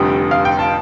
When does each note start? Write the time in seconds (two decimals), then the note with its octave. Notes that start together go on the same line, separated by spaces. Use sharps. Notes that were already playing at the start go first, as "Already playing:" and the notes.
Already playing: F1 F2 D3 G3 G5
0.31 F5
0.45 G5
0.59 A5